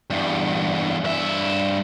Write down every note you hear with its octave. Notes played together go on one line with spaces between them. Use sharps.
E2 G2
G2 E5